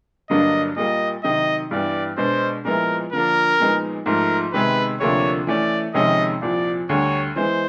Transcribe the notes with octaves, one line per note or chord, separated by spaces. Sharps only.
G2 D3 F#3 A#3 D4 D#5
A#2 G3 A#3 D#5
C3 D#3 F#3 D#5
G2 E3 G3 B3 D5
B2 G#3 B3 D4 C5
A#2 F3 G#3 B3 E4 A#4
D3 F3 A#3 D4 A#4
A#2 F3 G#3 B3 D#4
G#2 F3 A3 A#4
C3 D#3 G#3 B3 B4
D2 C3 F3 A#3 D4 C#5
E3 A3 C#4 D5
F2 C3 D#3 G#3 C#4 D#5
C2 A#2 F3 D5
D2 D3 G3 C#5
E3 G#3 B3 C5